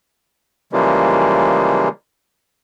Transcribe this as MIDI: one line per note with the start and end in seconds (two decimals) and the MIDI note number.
0.73 1.89 49
0.73 1.89 52
0.73 1.89 53
0.73 1.89 55
0.73 1.89 56
0.73 1.89 58